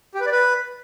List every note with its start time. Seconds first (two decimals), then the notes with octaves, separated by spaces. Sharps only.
0.15 G4
0.20 B4
0.26 D5
0.32 B4